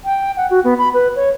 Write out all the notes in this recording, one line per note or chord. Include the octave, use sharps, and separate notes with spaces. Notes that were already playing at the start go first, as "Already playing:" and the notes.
G5
F#5
F#4
B3
B5
B4
C#5